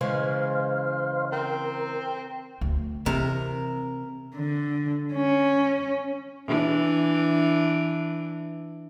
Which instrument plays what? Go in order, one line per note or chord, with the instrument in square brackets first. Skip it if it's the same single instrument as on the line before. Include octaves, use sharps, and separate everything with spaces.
[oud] C#3 E3 G#3 [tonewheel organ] C5 F5
[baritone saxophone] C4 [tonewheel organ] A#4
[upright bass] D2
[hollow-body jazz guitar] C3 [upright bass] E3 [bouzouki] A#4
[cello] D3
C#4
[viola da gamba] E3 D4